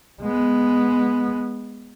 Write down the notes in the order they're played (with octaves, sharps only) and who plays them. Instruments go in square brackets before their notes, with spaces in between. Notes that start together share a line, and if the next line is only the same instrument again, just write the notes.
[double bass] G#3 B3